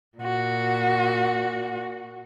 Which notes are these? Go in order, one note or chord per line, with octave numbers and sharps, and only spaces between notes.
A#2 F#4